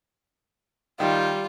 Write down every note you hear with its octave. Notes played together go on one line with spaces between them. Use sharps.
D#3 G3 F4